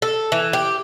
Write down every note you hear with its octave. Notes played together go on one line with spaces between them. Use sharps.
A4
E3
G4